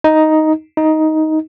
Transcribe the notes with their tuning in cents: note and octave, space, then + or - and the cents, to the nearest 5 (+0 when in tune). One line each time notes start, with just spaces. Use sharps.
D#4 +5
D#4 +10